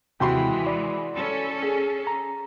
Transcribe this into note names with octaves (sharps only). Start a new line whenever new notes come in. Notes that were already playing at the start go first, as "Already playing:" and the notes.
D#2 C3 E3 G#3 F#4 G5 B5 C6
D5
C#4 A4
G#4
A#5